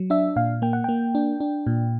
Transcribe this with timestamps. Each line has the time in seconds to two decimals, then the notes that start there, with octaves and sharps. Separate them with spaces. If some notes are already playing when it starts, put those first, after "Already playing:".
Already playing: F#3
0.10 D4 E5
0.36 A#2 F5
0.62 A#3 G5
0.73 F#5
0.84 A#3 G5
1.15 D4
1.40 D4
1.67 A#2